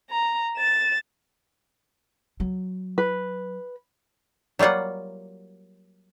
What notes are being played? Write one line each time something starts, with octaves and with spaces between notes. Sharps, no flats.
A#5
A6 E7
F#3
B4
F#3 G3 A#3 F4 F#5